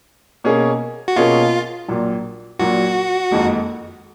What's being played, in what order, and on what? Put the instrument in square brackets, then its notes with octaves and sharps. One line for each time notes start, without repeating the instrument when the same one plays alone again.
[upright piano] B2 A#3 C#4 G#4
[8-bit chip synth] F#4
[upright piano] B2 A#3 C#4 G#4 [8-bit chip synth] F4
[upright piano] A#1 A#2 F#3
[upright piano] A#1 A#2 F#3 [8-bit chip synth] F#4
[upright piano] F#1 F2 D#3 G#3 D#4